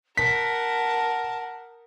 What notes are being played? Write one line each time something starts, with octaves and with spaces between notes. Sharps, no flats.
A#4 F#5 A5 B6